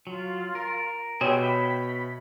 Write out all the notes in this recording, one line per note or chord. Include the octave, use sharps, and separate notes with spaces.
F#3 F4
A#4
B2 G4 G#4 C5 C#5 E5 G5
E5 G5 B5